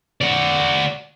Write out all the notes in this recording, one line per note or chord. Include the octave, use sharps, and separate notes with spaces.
F#4 D5